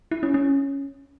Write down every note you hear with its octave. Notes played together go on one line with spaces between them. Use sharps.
E4
C#4
C#4